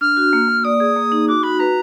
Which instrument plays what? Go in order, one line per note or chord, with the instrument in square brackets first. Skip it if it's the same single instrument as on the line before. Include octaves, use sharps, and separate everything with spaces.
[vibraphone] D4 [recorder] F6
[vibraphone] F#4
A#3
A#3
[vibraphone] D5 [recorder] D#6
[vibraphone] G#4
A#3
D#4
[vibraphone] F#4 [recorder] D6
[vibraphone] F#4 [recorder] B5
[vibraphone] B4 [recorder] A#5